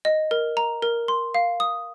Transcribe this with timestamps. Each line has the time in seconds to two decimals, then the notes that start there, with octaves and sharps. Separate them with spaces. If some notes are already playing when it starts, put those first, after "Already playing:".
0.05 D#5
0.31 A#4
0.57 A#5
0.82 A#4
1.08 C6
1.34 F5
1.60 D#6